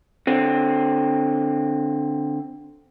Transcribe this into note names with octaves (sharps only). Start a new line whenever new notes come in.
D3 C4